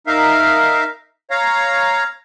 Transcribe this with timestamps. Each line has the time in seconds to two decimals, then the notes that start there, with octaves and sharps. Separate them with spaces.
0.07 D#4 A#4 E5 F5
1.31 C#5 F5 A#5